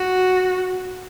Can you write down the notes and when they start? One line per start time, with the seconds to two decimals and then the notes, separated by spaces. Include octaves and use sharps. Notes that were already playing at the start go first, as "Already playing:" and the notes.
Already playing: F#4